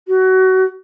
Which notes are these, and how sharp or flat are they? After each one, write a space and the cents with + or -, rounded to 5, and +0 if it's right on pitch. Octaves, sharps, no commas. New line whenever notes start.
F#4 +25